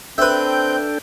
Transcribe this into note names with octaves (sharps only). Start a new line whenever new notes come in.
C4 D4 A4 B4 E5 G5 G6